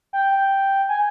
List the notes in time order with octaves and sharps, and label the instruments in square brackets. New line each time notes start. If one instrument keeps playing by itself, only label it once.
[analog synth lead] G5
G#5